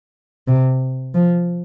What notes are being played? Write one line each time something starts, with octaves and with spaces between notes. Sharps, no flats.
C3
F3